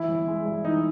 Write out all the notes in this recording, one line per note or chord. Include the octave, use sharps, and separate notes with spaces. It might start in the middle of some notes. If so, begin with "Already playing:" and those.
Already playing: E3 E4
G1
G#3
G2
E3 D#4